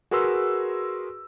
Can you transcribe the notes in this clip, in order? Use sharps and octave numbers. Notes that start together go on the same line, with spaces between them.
F#4 G#4 A#4 B4 C6 E6